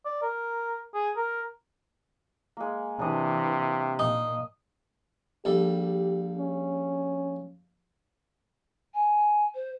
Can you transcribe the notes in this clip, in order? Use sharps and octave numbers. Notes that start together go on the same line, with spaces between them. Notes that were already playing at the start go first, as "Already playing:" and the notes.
D5
A#4
G#4
A#4
G#3 A#3
C3 E3 D4 D#5
A#2 D#4 D#5 D#6
A#1 G3 G4 A4
C#4
G#5
C5